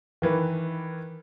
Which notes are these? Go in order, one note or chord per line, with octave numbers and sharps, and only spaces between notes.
D#3 E3 B4